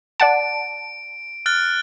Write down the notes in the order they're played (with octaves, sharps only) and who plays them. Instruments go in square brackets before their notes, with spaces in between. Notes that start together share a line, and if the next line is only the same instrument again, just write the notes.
[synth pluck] D5 F#5 A5 [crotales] D7
[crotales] F6 F#6 A6